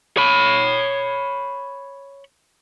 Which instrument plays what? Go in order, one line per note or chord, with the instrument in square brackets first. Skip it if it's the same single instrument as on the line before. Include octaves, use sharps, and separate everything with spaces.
[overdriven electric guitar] C#5 B5